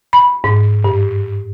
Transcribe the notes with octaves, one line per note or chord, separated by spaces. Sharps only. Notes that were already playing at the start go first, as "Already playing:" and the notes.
B5
G#2
G2